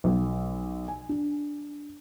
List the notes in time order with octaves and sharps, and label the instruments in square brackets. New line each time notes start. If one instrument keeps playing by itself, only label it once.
[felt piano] B1
G#5
D4